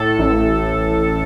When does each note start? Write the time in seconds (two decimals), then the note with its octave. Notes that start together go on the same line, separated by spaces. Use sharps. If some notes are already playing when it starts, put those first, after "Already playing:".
Already playing: A2 A4
0.19 A1